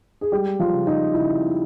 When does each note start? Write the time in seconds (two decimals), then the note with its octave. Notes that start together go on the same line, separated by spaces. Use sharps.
0.21 G#4
0.32 G3 G#3 G4
0.59 F3 F4
0.73 C#3
0.87 D#4
1.14 C#3 E4